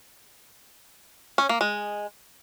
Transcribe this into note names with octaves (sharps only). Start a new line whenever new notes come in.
C#4
A#3
G#3